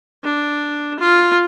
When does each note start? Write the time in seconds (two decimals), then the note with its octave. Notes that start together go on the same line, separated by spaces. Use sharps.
0.24 D4
0.99 F4